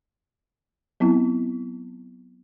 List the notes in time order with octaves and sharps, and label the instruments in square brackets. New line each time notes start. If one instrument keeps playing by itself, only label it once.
[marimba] F#3 B3 C4 E4